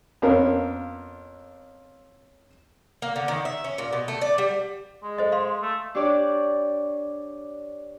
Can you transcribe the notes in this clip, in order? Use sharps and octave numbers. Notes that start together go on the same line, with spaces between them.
F2 B3 C#4 A#4 F5
A#3
D3
D#3
E5
C#4
A#2
B2
A3
D5
G3
G#3
A4 C5 D#5
F5 C6
A3
D4 G4 C#5 D5